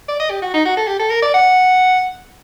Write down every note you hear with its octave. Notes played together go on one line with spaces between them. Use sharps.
D5
D#5
G4
F#4
D#4
F#4
A4
G4
A4
A#4
D5
F#5